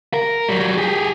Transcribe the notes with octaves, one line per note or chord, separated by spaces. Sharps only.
A#4
F#3 G3
G4 G#4